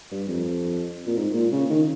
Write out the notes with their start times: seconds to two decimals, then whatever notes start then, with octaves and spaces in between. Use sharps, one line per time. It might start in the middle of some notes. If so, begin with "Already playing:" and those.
0.11 G2
0.28 F2
1.07 A#2
1.17 G#2
1.34 A#2
1.52 C#3
1.70 D#3